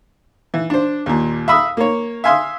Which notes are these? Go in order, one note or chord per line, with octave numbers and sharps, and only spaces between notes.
E3
D4 C5
D#2 A#2
E5 F5 B5 D#6 E6
A#3 C#5
E5 F5 G#5 C6 D#6 E6